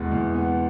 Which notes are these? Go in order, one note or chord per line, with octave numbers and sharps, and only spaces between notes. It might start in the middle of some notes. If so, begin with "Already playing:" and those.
Already playing: E2 B2 G#3 B3
E2
B3